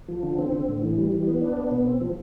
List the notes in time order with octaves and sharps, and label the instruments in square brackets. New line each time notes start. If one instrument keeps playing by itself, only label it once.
[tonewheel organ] F3
D3
C4
D3
A2
E3
G3
E3
B3
D4
B3
B2
C4
F3